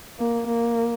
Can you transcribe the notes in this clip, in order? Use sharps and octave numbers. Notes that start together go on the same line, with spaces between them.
A#3
A#3